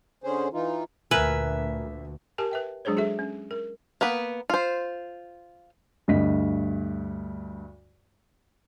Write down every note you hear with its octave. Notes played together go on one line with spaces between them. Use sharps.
D3 C#4 G#4 C5
E3 D#4 F4
D2 A#2 A#4 B4 E5 G#5
G4 A#4 G#5 A5
B4 E5 G5
F#3 G#3 D4 G#4 C5 C#5
F#4 G#4 A4 E5
C#4
A#4
A#3 B3 B4
F4 C5
D2 G2 D#5 B6